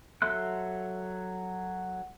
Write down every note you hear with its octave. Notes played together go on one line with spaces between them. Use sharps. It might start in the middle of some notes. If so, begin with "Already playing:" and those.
F#3 A4 E5 C6 F#6